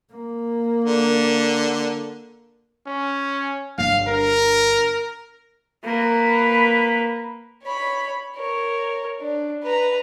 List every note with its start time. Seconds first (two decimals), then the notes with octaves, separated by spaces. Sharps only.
0.13 A#3
0.84 D3
2.87 C#4
3.78 G1 D4 F5
4.08 A#4
5.84 A#3 B4
7.63 C#5 B5
8.37 A#4 C#5
9.21 D4
9.63 B4 A#5